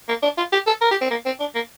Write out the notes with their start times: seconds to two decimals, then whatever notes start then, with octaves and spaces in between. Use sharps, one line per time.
0.09 A#3
0.23 D4
0.38 F4
0.53 G4
0.67 A4
0.81 A#4
0.91 G4
1.01 C4
1.11 A#3
1.26 C4
1.40 D4
1.55 A#3